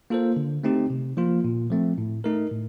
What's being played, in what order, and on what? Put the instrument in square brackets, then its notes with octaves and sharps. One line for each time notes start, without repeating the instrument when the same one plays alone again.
[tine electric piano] A#3 F4 A4 C5
D3
A3 C4 D#4 G4
C3
F3 A#3 F4
A#2
F3 A3 C4
A2
A3 D#4 A#4
A2